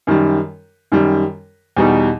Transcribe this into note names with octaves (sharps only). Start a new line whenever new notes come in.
F#2 D#3 G3
F#2 D#3 G3
E2 B2 G3 D#4